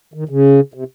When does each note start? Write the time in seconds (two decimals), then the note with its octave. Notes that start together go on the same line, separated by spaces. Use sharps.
0.14 D#3
0.29 C#3
0.74 C3